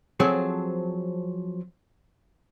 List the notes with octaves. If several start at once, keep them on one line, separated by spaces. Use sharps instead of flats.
F3 F#3 C4 G#4 A4